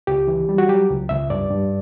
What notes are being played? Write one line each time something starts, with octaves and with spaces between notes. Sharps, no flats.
C#2 G4
E3
G3
F#4
F#3 G4
C#2
C#2 E5
G2 D5
G2